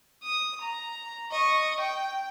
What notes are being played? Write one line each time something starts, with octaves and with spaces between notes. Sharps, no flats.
D#6
A#5
D#5 C#6
G5